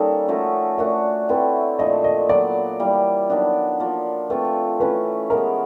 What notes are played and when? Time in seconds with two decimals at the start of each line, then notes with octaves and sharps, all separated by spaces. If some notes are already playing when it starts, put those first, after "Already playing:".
Already playing: D#3 G3 A#3 C#4 D#4 A4
0.28 F3 A3 C#4 F#4
0.78 A3 D4 F#4 A#4
1.29 A3 C4 E4 A4 B4
1.79 A#2 F3 A3 D4 D#5
2.04 D#5
2.29 A#2 F#3 B3 D5
2.80 E3 G3 A#3
3.30 D#3 F#3 B3 D4
3.80 F3 A#3 D4
4.30 A3 C4 F4 B4
4.80 E3 A3 C#4 B4
5.30 E3 G#3 B3 A#4